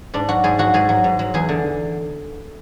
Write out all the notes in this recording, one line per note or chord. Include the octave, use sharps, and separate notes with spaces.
G#2 D4
F#3 F#4
G#2 G#4
F#3 F#4
G#2 G#4
F#3
G#2
F#3
E2 G#4
D3